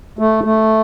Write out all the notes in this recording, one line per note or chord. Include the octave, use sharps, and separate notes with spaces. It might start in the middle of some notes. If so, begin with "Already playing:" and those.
A3
A3